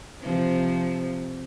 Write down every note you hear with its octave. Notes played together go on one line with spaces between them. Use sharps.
C3 F3